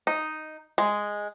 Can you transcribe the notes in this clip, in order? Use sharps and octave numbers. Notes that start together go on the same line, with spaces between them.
D#4
G#3